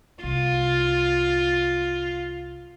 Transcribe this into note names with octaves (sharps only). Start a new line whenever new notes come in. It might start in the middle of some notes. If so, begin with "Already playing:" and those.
C2 F4